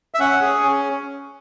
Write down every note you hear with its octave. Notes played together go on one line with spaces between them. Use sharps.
E5
C#4 F#5
G#4
C#4